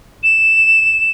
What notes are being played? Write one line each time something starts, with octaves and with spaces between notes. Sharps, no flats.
E7